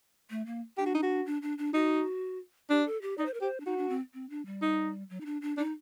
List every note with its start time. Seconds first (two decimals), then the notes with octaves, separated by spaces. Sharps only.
0.30 A3
0.46 A#3
0.78 D4 G4
0.86 F#4
0.94 D#4
1.03 F#4
1.26 D4
1.42 D4
1.58 D4
1.74 D#4 F#4
2.70 D4 G4
2.86 A4
3.02 G4
3.18 D#4 D5
3.26 C5
3.34 A#4
3.41 G4 C5
3.60 D4
3.66 D#4 F#4
3.78 D4
3.89 C4
4.14 C4
4.30 D4
4.46 G3
4.62 D#4
5.10 F#3
5.21 D#4
5.26 D4
5.42 D4
5.57 D4 D#4